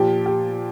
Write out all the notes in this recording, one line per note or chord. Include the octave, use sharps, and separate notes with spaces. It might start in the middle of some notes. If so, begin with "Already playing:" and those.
Already playing: A#2 F3 G4
G4